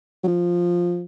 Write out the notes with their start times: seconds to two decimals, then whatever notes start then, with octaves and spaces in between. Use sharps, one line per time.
0.23 F#3
0.27 F3